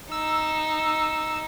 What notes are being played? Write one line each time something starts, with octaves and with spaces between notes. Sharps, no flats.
D#4 E6